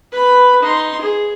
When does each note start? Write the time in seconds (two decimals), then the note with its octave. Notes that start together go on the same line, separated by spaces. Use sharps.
0.12 B4 B5
0.62 D#4 C6
1.01 G#4